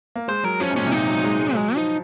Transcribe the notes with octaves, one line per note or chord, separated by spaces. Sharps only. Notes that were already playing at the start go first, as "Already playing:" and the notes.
A#3
G#3 C5
F#3 A#4
F3 C#4
G#2
A#2 C#4
C3
A#2 D#4
F#3
F#3
G#3
G#3
F#3 G#3
F3 D#4